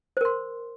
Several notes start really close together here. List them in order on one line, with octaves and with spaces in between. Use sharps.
C5 A#4 C6